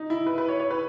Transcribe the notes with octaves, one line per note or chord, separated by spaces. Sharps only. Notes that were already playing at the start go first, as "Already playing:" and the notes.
Already playing: D#4
E4
B4
B4
C#5
C#5
B4